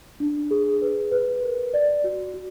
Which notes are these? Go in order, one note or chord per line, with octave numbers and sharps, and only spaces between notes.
D4
G#4
B4
B4
A#4
D5
F#4
F#4